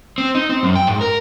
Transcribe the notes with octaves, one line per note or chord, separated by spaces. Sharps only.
C4
D#4
C4
F#2
G5
G#2
A#4